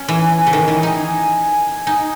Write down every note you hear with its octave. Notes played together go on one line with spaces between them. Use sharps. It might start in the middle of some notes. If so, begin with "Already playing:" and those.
Already playing: C#4
E3 G#5
C#3
D#3
E3
D#4
G#5
D#4 G#5